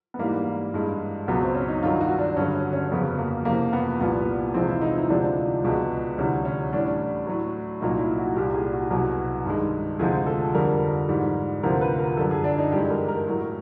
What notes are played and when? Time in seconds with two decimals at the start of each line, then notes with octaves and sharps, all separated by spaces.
0.14 B3
0.19 G#2 E3 G3 A#3
0.74 G2 E3 G#3
1.28 C#2 B2 F#3 B3
1.41 C4
1.55 C#4
1.68 D#4
1.83 G2 D#3 F#3 F4
2.01 F#4
2.19 D4
2.37 G2 D3 F#3 C#4
2.55 C#4
2.73 C#4
2.91 F2 C#3 F#3 B3
3.18 A#3
3.45 F2 C3 E3 A#3
3.73 B3
4.01 C2 A#2 G3 B3
4.54 E2 C3 F3 G#3 C4
4.68 E4
4.81 D#4
4.96 E4
5.09 D2 C3 F3 G#3 D4
5.64 C#2 B2 G#3
6.18 D2 C3 E3 G3 C#4
6.45 C#4
6.73 A2 E3 G3 D4
7.27 A2 F#3
7.81 C2 A#2 F#3 D#4
8.00 E4
8.18 F#4
8.36 C2 A#2 G3 G4
8.54 G#4
8.73 F#4
8.90 C2 B2 F#3
9.45 G2 D#3 G#3
9.99 D2 C3 F3 G#3 G#4
10.26 A4
10.53 F2 D3 G3 A#4
11.08 G#2 E3 G3
11.63 D2 C3 F3 A#4
11.81 B4
11.99 A#4
12.17 F#2 D3 G3 A4
12.31 G#4
12.44 D4
12.58 D#4
12.72 G2 E3 G#3 G4
12.90 A#4
13.08 A#4
13.27 A2 F#3